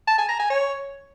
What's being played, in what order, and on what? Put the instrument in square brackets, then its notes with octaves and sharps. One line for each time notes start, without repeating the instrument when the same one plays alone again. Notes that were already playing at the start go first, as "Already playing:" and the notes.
[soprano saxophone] A5
G#5
A#5
G#5
C#5